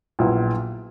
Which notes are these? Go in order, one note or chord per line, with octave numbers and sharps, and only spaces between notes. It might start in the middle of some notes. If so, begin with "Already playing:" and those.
A#1 A#2 F#3 B3 E4